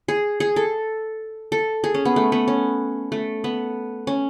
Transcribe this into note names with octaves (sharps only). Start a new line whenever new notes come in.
G#4
G#4
A4
A4
G#4
C#4
B3
A3
B3
C#4
A3
B3
C#4